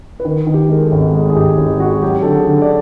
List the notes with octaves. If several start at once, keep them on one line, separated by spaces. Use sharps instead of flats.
B4
D#3 A#4
D#3
G4
G#3 A#4
A4
G#1
G#3 G#4
G#4
G#1 G4
G#1 G4
G#3 F#4
F#3 G4
D3 A4
G#4
D3
D5